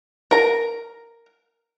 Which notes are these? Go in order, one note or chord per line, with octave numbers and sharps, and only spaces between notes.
A#4 A#5